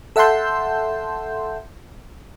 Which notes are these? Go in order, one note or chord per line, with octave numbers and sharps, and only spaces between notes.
A4 E5 F#5 A5 C6 G6